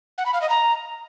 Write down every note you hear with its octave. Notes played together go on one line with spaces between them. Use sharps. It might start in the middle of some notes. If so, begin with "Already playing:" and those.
F#5
B5
F5
D#5
A#5